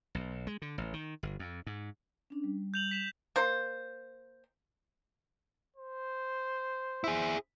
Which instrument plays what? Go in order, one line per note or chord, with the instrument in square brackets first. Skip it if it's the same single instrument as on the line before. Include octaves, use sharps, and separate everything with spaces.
[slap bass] B1
G#3
D3
A1
D#3
G1
F2
G#2
[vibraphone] C#4 D4
G3
[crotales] G6 F7 F#7
B6 E7 F7
[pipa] A#3 C5
[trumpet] C5
[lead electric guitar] E4 G#4